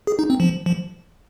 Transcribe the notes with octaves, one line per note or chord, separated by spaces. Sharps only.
G#4
D#4
C4
F3
F3